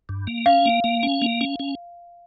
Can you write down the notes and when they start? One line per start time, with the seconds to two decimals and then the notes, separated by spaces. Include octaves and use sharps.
0.09 G2
0.27 A#3
0.46 C#4 F5
0.66 A#3
0.84 A#3
1.03 C#4
1.22 A#3
1.41 C#4
1.60 C#4